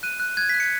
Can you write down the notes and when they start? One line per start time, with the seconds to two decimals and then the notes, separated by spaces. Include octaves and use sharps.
0.03 F#6 D#7
0.20 F#6
0.37 F#6 G#6
0.49 F#6 B6
0.60 C#7